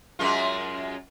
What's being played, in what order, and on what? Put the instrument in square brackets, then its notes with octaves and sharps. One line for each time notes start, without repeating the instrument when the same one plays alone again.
[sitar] F#2 G#3 F4